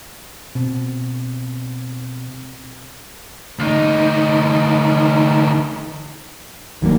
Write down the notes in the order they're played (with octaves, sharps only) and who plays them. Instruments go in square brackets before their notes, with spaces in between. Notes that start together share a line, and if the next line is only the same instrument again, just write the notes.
[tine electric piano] B2 C4
[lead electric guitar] D2 D#4
[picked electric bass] D1 A#3 [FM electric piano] D#3 F#3